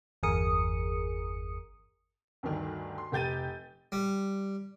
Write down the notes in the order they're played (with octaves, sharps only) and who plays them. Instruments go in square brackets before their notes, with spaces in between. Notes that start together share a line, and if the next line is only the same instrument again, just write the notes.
[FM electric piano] G1 E2 G#4 A#4 D#6 C#7
[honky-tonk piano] D2 G2 D3 D#3
C6
F1 G4 G6 A6 D#7
[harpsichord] G3